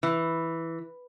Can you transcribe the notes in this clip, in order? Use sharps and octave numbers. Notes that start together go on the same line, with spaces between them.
E3